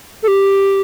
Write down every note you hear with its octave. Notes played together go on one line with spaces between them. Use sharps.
A4
G4